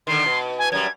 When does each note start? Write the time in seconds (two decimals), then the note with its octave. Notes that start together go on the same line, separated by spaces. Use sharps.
0.07 D3 D#3 C6
0.26 B2
0.59 G#5
0.72 F#2 G3 G#6